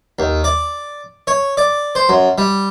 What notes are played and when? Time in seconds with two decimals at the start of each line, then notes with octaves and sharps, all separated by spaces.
0.19 D#2
0.44 D5
1.27 C#5
1.57 D5
1.95 C5
2.09 F#2
2.38 G3